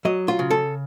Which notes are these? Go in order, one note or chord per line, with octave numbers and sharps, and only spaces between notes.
F#3 D#5
F4
C#3
A4